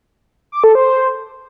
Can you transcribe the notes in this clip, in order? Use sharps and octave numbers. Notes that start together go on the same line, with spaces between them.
D6
A4
C5